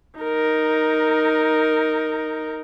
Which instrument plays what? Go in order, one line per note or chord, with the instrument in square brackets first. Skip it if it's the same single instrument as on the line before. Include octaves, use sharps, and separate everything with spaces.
[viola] D#4 A#4